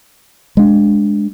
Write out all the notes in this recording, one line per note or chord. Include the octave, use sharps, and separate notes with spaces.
G#3 D4